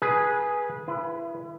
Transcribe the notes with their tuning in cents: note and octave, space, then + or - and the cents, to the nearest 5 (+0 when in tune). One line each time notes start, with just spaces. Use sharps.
G#4 +0 B4 -15
E4 +35 B4 +0